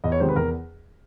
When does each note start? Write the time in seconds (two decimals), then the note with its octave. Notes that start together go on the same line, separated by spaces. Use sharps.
0.04 E2 D#5
0.12 C#5
0.20 C3 D#3 G#3 C5
0.29 B4
0.35 E2 A#4